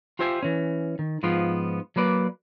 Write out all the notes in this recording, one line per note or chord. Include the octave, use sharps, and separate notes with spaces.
F4 G4 C5 E5 G#5
E3 C#4
D#3
G#2 F3 B3 F4 G5 C6
F#3 A#3 B4 D5